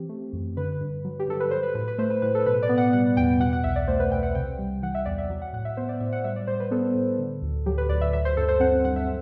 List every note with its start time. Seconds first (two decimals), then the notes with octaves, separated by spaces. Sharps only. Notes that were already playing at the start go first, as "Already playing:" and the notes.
Already playing: E3 C4 G4
0.09 A3
0.33 F#2
0.57 D3 B4
0.80 G2
1.05 F#3
1.19 G4
1.28 G2 A4
1.40 B4
1.51 F#3 C5
1.63 B4
1.75 A2 B4
1.88 B4
1.98 A3 C5
2.10 B4
2.22 A2 B4
2.35 A4
2.46 B2 B4
2.62 D5
2.69 B3
2.78 F#5
2.93 G3 F#5
3.17 E2 G5
3.40 B2 F#5
3.53 F#5
3.64 C2 E5
3.76 D5
3.88 A3 C5
4.00 B4
4.12 C2 G5
4.23 F#5
4.35 C3 G5
4.59 G3
4.82 E3 F#5
4.95 E5
5.05 E2 D5
5.18 E5
5.30 F#3
5.42 F#5
5.53 A2 F#5
5.65 E5
5.77 B3 C5
5.89 D5
6.00 A2 E5
6.13 F#5
6.24 G3 E5
6.36 D5
6.47 A2 C5
6.60 B4
6.71 B3 A4
6.95 A2
7.18 D3
7.42 D2
7.66 F#3 G4
7.78 B4
7.89 D2 D5
8.01 E5
8.13 F#3 E5
8.25 C5
8.37 G2 A4
8.49 C5
8.60 C4 F#5
8.85 G2 F#5
8.96 E5